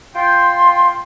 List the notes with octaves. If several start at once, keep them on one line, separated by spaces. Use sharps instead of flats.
F4 G5 C6